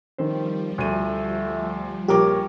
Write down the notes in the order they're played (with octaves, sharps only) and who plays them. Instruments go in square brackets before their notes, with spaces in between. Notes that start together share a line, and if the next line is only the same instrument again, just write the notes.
[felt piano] D#3 C4 C5 [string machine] F3 G3
[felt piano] D2 D#7 [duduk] A3
[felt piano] A#1 A#4 D6 [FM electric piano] G4 [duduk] C#5